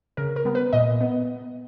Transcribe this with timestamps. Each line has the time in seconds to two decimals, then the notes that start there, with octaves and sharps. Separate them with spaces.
0.17 C#3 A#4
0.36 A#4
0.45 G3 B3
0.55 B4
0.73 A#2 D#5
1.01 B3